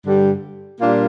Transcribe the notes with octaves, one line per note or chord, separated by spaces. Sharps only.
G2 D3 G3
A#2 G3 A#3 D4 F4